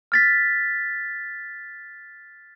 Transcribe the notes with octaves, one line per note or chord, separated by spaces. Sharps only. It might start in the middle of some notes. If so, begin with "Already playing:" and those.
F6 A6 B6